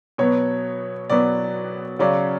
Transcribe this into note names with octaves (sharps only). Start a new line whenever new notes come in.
B2 F#3 B3 C#5
B2 F#3 B3 D5
C#3 F#3 C#4 D5